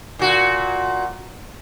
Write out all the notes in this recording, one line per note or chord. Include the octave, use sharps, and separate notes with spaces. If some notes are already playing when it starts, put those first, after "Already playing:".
A#2 F#4